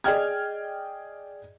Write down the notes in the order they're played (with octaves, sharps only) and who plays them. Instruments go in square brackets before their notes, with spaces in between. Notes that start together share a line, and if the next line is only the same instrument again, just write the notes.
[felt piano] G#4 D5 D#5 G5 F6 G#6